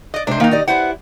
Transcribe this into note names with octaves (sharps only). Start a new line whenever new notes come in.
D5 D#5
C3 G#3 D4 C5
D#3 A#3 D#4 F5
G4 D5 D#5
B3 E4 G4 C5 F#5